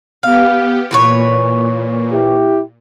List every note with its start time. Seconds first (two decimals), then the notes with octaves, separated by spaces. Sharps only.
0.23 B3 G4 F5
0.91 A#2 E3 B4 C#5
2.11 E4 G4